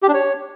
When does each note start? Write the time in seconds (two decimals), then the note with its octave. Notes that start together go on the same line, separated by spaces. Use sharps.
0.03 G4
0.08 D4
0.14 C#5